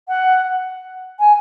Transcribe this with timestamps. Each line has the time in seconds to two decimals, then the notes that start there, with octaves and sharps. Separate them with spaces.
0.08 F#5
1.20 G#5